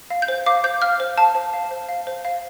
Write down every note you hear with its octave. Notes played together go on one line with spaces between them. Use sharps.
F5
G6
C5
F5 D6
C5 G6
F5 F6
C5
F5 A5
C5
F5
C5
F5
C5
F5